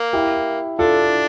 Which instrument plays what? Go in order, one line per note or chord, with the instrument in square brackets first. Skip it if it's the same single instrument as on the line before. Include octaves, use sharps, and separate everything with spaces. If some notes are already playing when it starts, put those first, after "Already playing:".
Already playing: [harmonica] A#3
[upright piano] E4 G4
[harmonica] D4 [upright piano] F4 A4